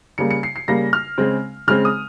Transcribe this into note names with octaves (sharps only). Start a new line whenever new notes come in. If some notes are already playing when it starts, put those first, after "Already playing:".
C#3 G3 A#3 C#7
C#7
C7
C7
C#3 G3 A#3 A#6
F6
C#3 G#3 C4
C#3 G#3 C4 F6
D#6